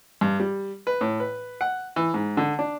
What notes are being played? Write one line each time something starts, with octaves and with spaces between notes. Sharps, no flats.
G2
G3
B4
A2
B4
F#5
E3
G#2
D3
D4